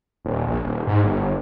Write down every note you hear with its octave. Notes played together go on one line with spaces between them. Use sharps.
D#1
A#1
D#1
G#2
G1